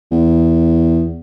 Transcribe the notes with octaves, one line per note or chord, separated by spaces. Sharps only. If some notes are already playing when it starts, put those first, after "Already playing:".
E2